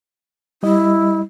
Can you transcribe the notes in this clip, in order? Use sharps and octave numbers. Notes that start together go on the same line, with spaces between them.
G3 E4 D#5